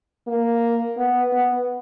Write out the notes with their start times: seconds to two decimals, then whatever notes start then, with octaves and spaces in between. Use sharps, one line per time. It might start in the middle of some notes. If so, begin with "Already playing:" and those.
0.28 A#3
0.97 B3
1.32 B3